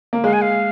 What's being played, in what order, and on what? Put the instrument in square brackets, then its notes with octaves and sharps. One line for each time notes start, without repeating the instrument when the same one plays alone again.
[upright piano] A#3
[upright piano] G#3 [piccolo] F5
[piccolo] G#5
F5